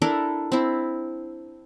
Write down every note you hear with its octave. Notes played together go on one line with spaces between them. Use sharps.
D4 E4 A4 A#4
C4 E4